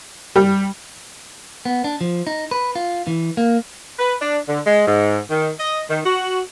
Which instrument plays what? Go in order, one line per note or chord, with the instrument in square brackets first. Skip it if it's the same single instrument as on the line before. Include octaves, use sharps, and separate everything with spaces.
[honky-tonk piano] G3
[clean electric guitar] B3
D4
F3
D#4
B4
F4
E3
A#3
[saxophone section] B4
D4
D3
G#3
G#2
D#3
D#5
D#3
F#4